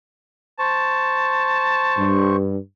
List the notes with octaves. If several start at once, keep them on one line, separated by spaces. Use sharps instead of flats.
C5 A5 C#6
G2